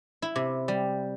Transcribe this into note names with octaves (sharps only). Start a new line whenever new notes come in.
E4
C3
G3